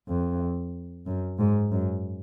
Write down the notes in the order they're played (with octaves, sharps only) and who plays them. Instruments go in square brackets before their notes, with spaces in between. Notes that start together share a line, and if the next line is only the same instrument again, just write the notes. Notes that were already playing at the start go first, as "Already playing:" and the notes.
[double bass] F2
F#2
G#2
F#2